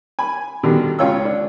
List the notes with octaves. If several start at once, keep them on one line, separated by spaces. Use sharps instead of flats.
G#5 B5
B2 D3 D#3 G3
C#2 C#4 F4 C#5 G5 E6
D4